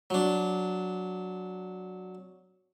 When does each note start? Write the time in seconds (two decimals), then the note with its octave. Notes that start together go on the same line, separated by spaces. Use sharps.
0.10 F#3 D4